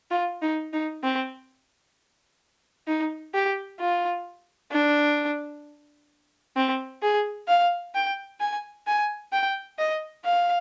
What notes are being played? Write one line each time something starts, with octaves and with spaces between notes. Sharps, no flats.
F4
D#4
D#4
C4
D#4
G4
F4
D4
C4
G#4
F5
G5
G#5
G#5
G5
D#5
F5